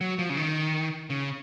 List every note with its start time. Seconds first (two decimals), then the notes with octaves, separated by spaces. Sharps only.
0.01 F#3
0.19 F3
0.30 C#3
0.37 D#3
1.10 C#3